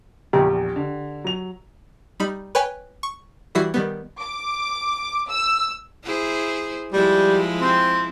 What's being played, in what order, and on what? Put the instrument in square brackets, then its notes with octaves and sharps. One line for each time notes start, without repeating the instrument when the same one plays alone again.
[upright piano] A#1 E2 [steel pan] G4
[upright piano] D3
F#3 F7
[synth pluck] G3 D#4 B5
B4 C#5 G5 G#5
C#6
E3 G3 E4 F#4 C7
D#3 G3 B3
[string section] D6
E6
[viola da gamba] E4 G#4 C5
[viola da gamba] F3 G#3 E4 [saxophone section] G3
[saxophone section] C4